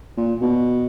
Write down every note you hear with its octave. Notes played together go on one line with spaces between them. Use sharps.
A#2
B2